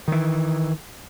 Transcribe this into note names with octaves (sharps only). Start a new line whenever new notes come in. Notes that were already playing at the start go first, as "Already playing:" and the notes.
D#3 E3